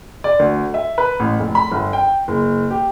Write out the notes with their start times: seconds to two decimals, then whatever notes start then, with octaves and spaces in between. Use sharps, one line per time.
0.24 D5
0.39 D2
0.74 E5
0.98 B4
1.20 A1
1.40 F1
1.55 B5
1.71 G1
1.93 G5
2.28 F#1
2.71 G4